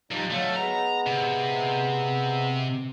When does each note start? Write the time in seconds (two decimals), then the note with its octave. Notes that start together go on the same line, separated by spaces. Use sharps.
0.11 F2 G3 D#4 D5
0.31 F#3 A3 F5
0.56 G#3 B3 A#5
1.07 C3